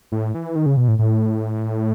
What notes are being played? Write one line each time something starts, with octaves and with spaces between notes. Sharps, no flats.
A2
E3
D#3
C#3
B2
A2
A2